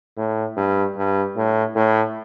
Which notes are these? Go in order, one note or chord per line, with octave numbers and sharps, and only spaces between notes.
A2
G2
G2
A2
A2